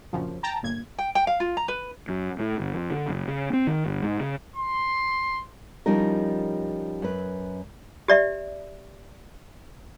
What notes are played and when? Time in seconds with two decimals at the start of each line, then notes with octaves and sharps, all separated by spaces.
0.13 A#1 F#2 C#3 F3
0.43 G5 A5 A#5
0.62 G1 A#2 G#6
0.98 G5
1.15 G5
1.27 F5
1.40 F4
1.57 A#5
1.68 B4
2.09 F#2
2.40 A2
2.60 G1
2.74 F2
2.90 D3
3.08 F#1
3.28 C#3
3.53 C4
3.67 D#3
3.86 G1
4.02 G#2
4.20 C#3
4.56 C6
5.86 F3 G3 C#4 D#4 A#4
7.02 F#2 B4
8.08 G4 D5 E5